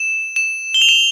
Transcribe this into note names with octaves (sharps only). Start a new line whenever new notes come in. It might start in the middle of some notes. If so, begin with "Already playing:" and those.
Already playing: E7
E7
G7
F7
E7